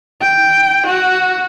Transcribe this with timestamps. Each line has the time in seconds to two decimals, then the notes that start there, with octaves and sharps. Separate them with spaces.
0.21 G5
0.87 F#4